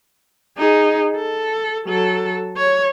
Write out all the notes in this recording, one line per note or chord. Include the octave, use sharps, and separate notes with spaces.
D#4 G#4
A4
F#3 A4
C#5